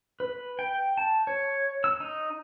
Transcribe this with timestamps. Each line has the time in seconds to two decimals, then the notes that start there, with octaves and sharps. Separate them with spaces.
0.20 B4
0.59 G5
0.98 A5
1.27 C#5
1.84 E6
2.00 D#4